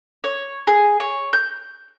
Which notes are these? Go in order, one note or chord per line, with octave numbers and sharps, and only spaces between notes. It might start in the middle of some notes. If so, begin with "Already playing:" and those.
C#5
G#4
C#5
G6